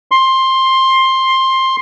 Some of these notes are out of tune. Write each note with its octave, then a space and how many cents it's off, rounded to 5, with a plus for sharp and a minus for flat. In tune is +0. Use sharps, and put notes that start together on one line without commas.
C6 +15